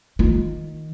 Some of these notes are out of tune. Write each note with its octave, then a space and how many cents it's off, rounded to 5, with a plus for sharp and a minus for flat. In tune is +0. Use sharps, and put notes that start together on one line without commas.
D#3 +0 F4 +15